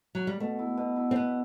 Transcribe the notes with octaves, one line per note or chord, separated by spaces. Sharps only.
F#3
G3
B2 A3
E4
B2
E4
C4
B2 B3